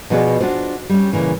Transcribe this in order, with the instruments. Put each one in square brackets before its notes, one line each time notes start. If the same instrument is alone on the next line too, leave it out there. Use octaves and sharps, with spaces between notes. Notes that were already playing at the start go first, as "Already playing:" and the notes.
[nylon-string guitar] B2 F3 B3 F#4 G#4 D5
D4 F4 F#4 C5
G3 C#4
A#2 C#3 E3